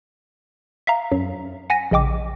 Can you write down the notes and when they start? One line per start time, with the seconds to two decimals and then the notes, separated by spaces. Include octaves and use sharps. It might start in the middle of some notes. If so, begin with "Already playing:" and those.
0.87 E5 F5 A#5
1.12 F#2 F#3
1.70 F#5 G#5 A#6 B6 D#7
1.91 A#1 C#3 D#5 G5 D6